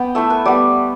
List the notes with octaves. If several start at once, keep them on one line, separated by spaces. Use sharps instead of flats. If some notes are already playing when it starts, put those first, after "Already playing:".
Already playing: B3 G5
A3 E4 E5
B4
G3 B3 D5